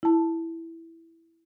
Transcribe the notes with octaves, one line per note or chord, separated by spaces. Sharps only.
E4 A5